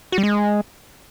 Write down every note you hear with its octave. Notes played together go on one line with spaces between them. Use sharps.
F#4
G3
G#3